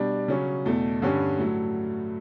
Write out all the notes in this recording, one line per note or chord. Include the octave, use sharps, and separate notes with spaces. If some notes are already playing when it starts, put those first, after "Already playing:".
Already playing: B2 G3 D4
C#3 F#3 C#4
E2 B2 A3
G2 D3 G3 C#4
A2 F#3 A3